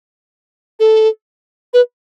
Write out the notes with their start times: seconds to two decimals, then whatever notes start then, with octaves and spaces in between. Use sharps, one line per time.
0.80 A4
1.74 B4